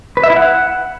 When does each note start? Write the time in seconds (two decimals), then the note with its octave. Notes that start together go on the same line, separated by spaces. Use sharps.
0.17 B4
0.23 E5
0.30 E4
0.36 F#5